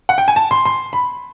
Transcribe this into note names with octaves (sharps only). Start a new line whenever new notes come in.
F#5
G5
G#5
A5
C6
C6
B5